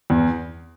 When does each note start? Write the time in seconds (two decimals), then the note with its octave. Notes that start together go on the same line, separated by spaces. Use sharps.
0.10 E2